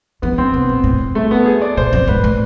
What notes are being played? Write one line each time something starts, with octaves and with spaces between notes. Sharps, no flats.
E3 B3
D3 C4
C3 B3
B2
A2
A3
B3
G#4
D5
B2 C5
F2
G#2 B4
A2